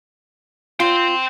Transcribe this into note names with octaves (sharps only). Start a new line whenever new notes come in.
F4 G5 C6